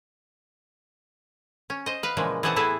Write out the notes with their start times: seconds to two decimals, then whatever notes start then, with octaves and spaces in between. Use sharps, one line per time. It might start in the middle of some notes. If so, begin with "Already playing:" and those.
1.70 C#4
1.86 C5 D#5
2.03 B4 F5
2.17 A#2 C#3 E3 F3 G#3
2.43 E3 C4 G#4 C5 F#5 A5
2.56 A2 B3 E4 G#4 A4 A5